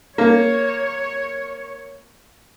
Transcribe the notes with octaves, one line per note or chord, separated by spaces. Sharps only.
A#3 C#5